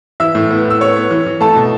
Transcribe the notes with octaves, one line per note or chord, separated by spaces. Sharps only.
E3 E5 E6
A2
B3
A2
E6
B3 C#5 C#6
B3
E3
E3
A3 A4 A5
B2